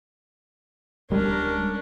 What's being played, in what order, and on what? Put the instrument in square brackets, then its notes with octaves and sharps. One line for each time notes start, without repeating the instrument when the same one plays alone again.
[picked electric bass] D1 G3 G#3 [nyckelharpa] C#4 D4 [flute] A#4